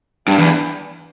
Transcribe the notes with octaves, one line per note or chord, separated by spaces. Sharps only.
G2 D4
E2